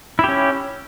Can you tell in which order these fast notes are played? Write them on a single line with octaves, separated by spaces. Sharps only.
E4 G4 C#4